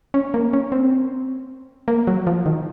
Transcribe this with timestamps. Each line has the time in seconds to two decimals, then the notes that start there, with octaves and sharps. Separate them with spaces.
0.14 C#4
0.34 A#3
0.53 C#4
0.72 C4
1.88 A#3
2.07 F#3
2.27 F3
2.46 D#3